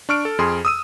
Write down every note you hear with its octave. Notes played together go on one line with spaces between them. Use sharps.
D4 C#6 F6 D7
A4
F2 G#4 C6
D#6 E6 D#7